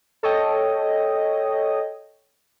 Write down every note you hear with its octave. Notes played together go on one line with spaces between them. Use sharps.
A4 C#5 D#5 G5